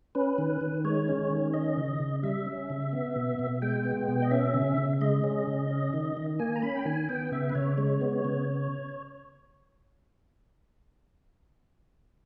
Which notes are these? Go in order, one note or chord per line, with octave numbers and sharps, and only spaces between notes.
C#4 B4
D#3
D#3
G#3 C#5
C#4
D#3
C#4 D#5
C#3
C#3
G3 E5
C#4
C#3
B3
B2
B2
G#3 G5
B3
B2
D#5
C#4 E5
C#3
C#3
G#3 D#5
C#4
C#3
C#4
D#3
D#3
A#3 G#5
A#5
C#4 B5
G5
D#3 G#5
B3 G5
C#3 E5
B4
C#3 C#5
G#3 C#5
B3
C#3